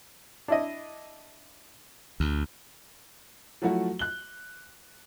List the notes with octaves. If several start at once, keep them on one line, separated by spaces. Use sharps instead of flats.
D4 E4 D#5
D2
F3 F#3 A3 E4 F#4
F#6 G7